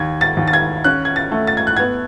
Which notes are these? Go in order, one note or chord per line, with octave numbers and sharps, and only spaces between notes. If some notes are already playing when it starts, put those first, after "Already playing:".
Already playing: D#2 G#6
A6
D#2
A6
G#6
C#4 F#6
G#6
A6
A3
A6
G#6
F#6
B3 G#6